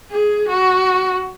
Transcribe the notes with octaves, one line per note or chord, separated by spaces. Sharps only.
G#4
F#4